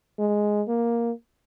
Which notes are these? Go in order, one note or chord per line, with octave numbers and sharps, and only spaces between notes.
G#3
A#3